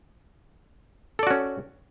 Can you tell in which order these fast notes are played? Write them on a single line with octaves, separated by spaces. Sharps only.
A4 D5 F#4 C#4